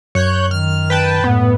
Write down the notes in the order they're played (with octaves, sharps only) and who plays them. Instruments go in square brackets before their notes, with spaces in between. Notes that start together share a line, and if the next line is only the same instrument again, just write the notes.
[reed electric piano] F#2 [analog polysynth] C#5 F#6 G6
[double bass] D#3 [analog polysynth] F6
[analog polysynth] B4 G5 A5
[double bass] A2 [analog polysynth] B3